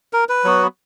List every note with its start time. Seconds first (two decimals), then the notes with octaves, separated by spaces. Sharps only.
0.13 A#4
0.29 B4
0.44 F#3 B3 F#4